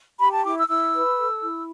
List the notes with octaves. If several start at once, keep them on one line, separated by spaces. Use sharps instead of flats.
G4 B5
A5
E4 D6
E6
E4 E6
B4
A4
E4